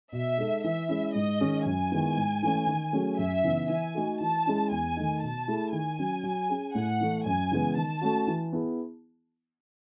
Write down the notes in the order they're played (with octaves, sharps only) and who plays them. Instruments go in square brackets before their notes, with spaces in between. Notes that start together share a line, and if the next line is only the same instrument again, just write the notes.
[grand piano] B2 [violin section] E5
[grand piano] G#3 D#4 A4
[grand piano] E3 [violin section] E5
[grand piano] G#3 C#4 E4
[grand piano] G#2 [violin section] D#5
[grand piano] D#3 G#3 C#4
[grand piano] F#2 [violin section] G#5
[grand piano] D#3 G#3 B3 E4
G#2
E3 A3 C#4
D#3
F#3 A3 C#4 G#4
[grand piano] F#2 [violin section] E5
[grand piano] C#3 E3 B3 D#4
[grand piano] E3 [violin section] G#5
[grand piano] A3 D#4 F#4 A4
[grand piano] E3 [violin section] A5
[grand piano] G#3 C#4 E4
[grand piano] E2 [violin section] G#5
[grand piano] D#3 A3 D#4
[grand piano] B2 [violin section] A5
[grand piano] A3 E4 G#4
[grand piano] D#3 [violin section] G#5
[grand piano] F#3 C#4
F#3
C#4 G#4
[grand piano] A2 [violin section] F#5
[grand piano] E3 A3
[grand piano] F#2 [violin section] G#5
[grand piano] C#3 E3 G#3 B3
[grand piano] D#3 [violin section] A5
[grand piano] A3 C#4 F#4
E3
B3 E4 G#4